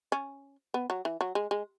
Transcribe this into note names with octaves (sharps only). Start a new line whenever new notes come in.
C#4
B3
F#3
E3
F#3
G#3
G#3